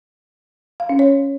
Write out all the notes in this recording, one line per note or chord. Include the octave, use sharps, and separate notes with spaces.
F5
C#4
C#5